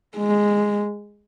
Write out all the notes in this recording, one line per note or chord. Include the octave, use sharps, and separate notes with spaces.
G#3